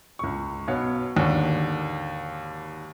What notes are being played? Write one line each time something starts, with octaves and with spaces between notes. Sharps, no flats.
C#2 C#6
B1 B3 C#5 F5
G#1 D#2 D3